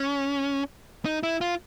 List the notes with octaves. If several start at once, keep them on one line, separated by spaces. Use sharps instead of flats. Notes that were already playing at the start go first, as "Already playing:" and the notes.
Already playing: C#4
D#4
E4
F4